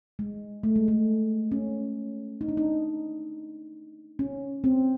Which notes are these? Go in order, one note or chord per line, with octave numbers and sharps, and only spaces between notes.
G#3
A3
G#3
A3
C#4
D#4
D4
D#4
C#4
C4